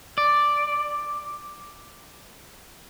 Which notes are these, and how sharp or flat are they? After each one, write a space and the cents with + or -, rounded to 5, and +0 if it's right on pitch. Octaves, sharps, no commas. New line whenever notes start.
D5 +0